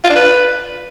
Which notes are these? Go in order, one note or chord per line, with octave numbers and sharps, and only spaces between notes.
F4
D4
B4